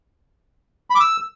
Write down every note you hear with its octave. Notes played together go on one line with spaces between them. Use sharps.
B5
D6
E6